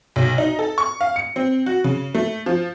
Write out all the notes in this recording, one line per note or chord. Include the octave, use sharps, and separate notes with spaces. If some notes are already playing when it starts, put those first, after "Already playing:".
B1
D#4
A4
C#6
F5
C#7
C4
F#4
C#3
A3
F3